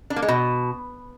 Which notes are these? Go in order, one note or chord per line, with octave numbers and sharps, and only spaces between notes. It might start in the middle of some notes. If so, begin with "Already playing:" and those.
D4
A#3
G#3
B2